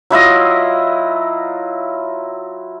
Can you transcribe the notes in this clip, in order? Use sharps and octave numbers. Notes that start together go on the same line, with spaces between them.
F#3 E4 F4 D#5